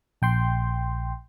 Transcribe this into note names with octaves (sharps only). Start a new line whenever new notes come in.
A#1 G5 C6